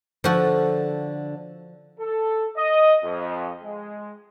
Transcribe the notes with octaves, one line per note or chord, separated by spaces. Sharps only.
D3 F3 F#4 A4
A4
D#5
F2
G#3